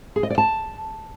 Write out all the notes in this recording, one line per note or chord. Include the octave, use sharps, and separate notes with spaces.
G#4
D#5
D5
A5